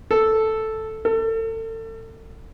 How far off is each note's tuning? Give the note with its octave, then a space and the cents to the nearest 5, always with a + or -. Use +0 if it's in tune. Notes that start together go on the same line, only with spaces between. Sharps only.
A4 +0
A4 +35